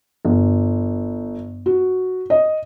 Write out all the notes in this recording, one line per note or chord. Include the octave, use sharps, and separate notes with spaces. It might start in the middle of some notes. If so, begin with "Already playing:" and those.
G1
F#4
D#5